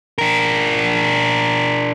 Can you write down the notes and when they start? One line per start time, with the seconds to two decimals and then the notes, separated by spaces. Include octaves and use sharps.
0.18 D4 A#4